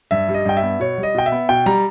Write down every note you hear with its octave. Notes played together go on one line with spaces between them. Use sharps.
G2 E5
G3
D#5
G2 G5
E5
B3
B2 C#5
G3
D#5
B2 G5
E5
B3
B2 G5
G3 A#5